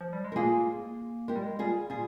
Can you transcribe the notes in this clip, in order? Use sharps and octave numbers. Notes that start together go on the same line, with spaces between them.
F3
G3
G#3
A#4
A#3 F4 G#4
G#3 G4 A#4
G3
G#3
G3 F4 G#4
G3 F4 G#4